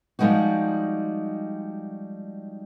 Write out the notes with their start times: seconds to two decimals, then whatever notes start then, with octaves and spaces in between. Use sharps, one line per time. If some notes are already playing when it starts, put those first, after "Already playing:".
0.19 F3 G3 G#3 D#4 F#4